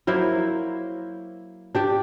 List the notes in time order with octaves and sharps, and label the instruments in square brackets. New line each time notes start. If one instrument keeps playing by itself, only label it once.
[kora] F#3 A#3 E4 C5
D4 G4 D5